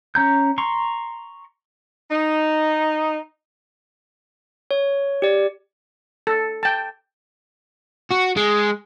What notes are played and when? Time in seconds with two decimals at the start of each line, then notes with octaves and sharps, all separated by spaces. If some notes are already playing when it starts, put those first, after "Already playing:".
0.15 C#4 A#5 G6
0.58 A#5 C6 C#6
2.10 D#4
4.71 C#5
5.22 G4 D5
6.27 A4
6.63 G5 A5
8.11 F#4
8.37 G#3